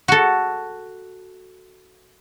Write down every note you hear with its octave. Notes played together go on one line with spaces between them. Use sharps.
F#4 A4